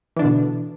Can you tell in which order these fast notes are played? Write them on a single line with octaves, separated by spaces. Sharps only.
E3 D4 D3 B2